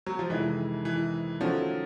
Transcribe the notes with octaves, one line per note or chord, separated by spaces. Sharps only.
F#3
F3
F2 C3 D#3 E3 G#3
E3
D#3 F3 F#3 A3 C#4 F#4